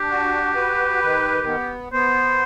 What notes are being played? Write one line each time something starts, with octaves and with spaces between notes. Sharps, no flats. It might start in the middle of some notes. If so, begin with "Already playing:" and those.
Already playing: D4 G4
F#4
B4
D#3
B3
B3 C5